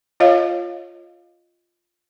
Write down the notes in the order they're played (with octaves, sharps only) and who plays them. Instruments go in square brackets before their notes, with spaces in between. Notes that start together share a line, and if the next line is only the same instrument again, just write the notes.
[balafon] F4 C#5 D#5 F5